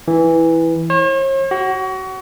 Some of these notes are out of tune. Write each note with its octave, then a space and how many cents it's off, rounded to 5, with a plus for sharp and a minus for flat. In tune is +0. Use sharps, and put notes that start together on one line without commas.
E3 -5
C#5 -45
F#4 +30